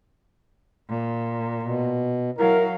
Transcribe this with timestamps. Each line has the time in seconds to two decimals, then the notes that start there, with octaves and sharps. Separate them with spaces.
0.89 A#2
1.63 B2
2.39 F#3 E4 A#4 F5